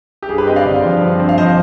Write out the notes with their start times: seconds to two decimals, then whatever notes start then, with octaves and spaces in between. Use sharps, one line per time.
0.22 G4
0.29 G2 G#4
0.38 G4 B4
0.47 C4 D#5 G5
0.56 D5 F5
0.65 D3
0.84 F3
1.01 G2
1.20 C4
1.29 F5
1.38 F3 C5 D#5